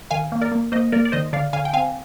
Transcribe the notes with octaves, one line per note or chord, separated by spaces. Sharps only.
D#3 F5 G#5
A#3
A#4 D5
A#3
A#3 C5 D#5
A#3 A#4 D5
D5
D#3 C5 D#5
D3 D5 F5
D3 F5 G#5
G5
C4 F5 G#5